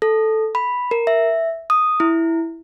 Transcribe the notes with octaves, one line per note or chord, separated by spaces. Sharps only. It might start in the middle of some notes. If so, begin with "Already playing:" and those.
A4
B5
A#4
E5
D#6
E4